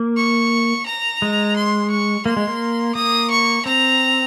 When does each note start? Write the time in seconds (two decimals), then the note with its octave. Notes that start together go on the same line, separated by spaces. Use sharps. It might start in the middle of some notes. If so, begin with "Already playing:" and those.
Already playing: A#3
0.17 C#6
0.87 A#5
1.22 G#3
1.57 C6
1.91 C#6
2.26 A#3 C6
2.37 G#3
2.47 A#3
2.95 A#3 D#6
3.31 C#6
3.66 C4 A#5